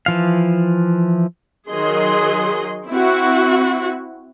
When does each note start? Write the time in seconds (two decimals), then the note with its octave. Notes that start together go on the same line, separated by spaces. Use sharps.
0.06 E3 F3 F5
1.70 D#3 F#3 D#4 G#4 D#5 C6
2.88 C4 E4 F#4